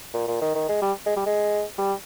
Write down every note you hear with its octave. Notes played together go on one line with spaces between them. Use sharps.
A#2
A#2
D#3
D#3
G#3
G3
G#3
G3
G#3
G3